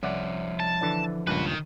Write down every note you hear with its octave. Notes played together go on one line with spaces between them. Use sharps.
C2 F3 C#5 D5 E5 F#5
A5
D3 E3 D4
C#2 G2 A#2 F#4 B4
D#3